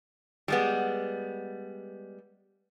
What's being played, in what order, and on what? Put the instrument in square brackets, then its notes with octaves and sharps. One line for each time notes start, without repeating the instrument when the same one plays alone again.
[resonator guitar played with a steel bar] G3 G#3 B3